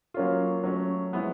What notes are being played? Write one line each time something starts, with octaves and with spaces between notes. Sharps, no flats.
F#3 A#3 C#4 F4
F#3 A3 C#4
F3 G#3 B3 E4